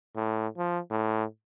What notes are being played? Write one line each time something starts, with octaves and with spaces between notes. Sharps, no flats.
A2
F3
A2